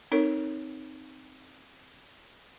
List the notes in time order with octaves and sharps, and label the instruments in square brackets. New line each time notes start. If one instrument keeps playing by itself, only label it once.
[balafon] C4 D#4 A4 A#4 C#5